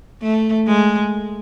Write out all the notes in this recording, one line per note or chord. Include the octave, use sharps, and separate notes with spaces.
A3
G#3